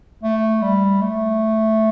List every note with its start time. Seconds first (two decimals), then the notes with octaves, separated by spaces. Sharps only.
0.23 A3
0.62 G3
1.02 A3